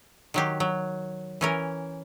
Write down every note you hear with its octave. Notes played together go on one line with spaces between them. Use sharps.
D#3 F#3 G4
F#3
E3 C#4 A#4